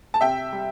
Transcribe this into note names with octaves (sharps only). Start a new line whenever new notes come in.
A5
C3 E5 G5
G3